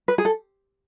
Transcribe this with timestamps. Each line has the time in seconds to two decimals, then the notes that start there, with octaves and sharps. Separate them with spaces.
0.08 B4
0.18 G#4
0.25 A4